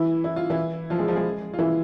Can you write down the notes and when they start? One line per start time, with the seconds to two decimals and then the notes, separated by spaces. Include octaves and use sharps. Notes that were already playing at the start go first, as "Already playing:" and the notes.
Already playing: E3 E4
0.24 E4
0.36 F4
0.50 E3 E4
0.90 F3 F4
0.99 G#3 G#4
1.08 F3 F4
1.16 G#3 G#4
1.54 F4
1.59 E3 E4